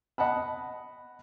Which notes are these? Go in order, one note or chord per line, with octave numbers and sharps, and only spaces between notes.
D#5 F#5 A5 B5